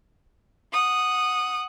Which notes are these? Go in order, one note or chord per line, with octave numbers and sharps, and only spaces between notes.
F#5 D#6